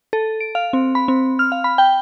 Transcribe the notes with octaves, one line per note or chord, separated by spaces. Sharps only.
A4
D7
F5
C4
B5
C4
F6
F5
B5
G5